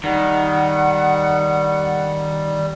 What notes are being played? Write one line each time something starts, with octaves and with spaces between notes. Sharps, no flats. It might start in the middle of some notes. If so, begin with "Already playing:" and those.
D#3 G3 F#5